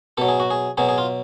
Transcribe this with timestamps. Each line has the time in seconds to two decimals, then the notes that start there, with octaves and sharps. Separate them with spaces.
0.17 B2 F#3 A4
0.28 G#4
0.40 F#4
0.51 G#4
0.77 B2 F#3 G#4
0.89 G#4
0.98 F4